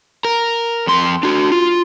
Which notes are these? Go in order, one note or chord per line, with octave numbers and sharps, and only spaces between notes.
A#4
F2 C6
D4 F#4
F4